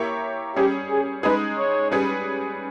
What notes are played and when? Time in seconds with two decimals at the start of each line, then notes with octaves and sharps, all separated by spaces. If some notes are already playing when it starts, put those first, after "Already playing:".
Already playing: A#3 E4 G4 A#4 C#5
0.56 G3 C#4 G4 G#4
0.90 G#4
1.23 G#3 D#4 G#4 B4
1.58 C#5
1.92 G3 C#4 G#4 B4